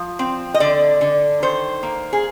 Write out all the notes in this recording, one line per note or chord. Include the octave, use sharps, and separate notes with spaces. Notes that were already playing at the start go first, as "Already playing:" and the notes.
Already playing: F3
C4
D#5
D3 D5
D3
D#3 C5
A#3
G#4